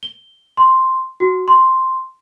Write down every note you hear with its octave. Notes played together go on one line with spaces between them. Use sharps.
G7
C6
F#4
C6